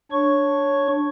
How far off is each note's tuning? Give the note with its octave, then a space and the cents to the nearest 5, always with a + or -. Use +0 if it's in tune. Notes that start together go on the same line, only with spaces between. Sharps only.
D4 +0 C#5 +0 C#6 +0